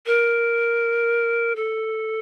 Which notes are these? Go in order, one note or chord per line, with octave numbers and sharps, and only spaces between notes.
A#4
A4